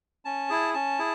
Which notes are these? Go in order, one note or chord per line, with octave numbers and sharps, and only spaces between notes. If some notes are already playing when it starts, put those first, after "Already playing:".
C#4 A5
E4 G#4
C#4 A5
E4 G#4